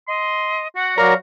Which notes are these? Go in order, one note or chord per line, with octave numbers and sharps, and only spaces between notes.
D#5 C6
F#4 F#5
F#3 A#4 C#5 D5 F5